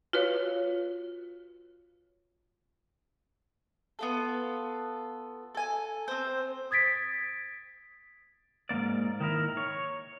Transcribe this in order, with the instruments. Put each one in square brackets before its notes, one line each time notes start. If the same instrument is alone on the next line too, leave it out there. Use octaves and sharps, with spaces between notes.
[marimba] F4 F#4 B4 C#5 F5
[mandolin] B3 F4 A4
A4 G#5
C4 C5
[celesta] D#6 G#6 A6 B6 D7
[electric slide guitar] G#2 E3 A#3 D5
D#3 D#4 E4 A#4
C#5